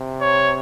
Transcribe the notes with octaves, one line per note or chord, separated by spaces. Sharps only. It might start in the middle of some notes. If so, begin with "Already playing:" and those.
Already playing: C3
C#5